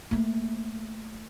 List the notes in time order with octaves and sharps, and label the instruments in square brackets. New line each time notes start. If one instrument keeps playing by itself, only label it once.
[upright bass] A3 A#3